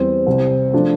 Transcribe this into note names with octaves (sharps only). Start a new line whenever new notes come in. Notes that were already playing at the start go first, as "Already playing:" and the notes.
Already playing: E2 E3 G3 C4
C2 C3 G3
F3 A3 D4